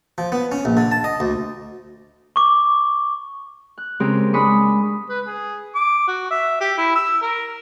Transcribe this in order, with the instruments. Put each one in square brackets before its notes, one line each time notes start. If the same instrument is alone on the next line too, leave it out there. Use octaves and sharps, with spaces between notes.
[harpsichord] F3
B3
C#4
A#1
D3
A5
D#5
D2
[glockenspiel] C#6 D6
[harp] F#6
C#3 G#3 C4 G4 A#4
G#3 D4 B5 C#6 D#6
[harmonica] B4
G#4
D6
F#4
E5
G4
E4
E6
A#4